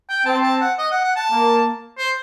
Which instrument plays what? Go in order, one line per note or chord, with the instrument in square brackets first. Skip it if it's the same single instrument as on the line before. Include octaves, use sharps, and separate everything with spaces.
[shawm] G5
[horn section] C4 [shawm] A5
[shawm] A5
F#5
D#5
F#5
F#5
A5
[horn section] A#3
[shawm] C5